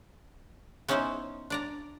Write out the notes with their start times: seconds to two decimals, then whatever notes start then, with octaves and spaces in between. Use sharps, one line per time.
0.88 B3 C#4 D#4 E4 B4 C5
1.50 D4 D5 A#5